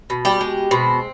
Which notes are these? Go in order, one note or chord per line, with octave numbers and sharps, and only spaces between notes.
B2
G3 G4
G#3
B2 C4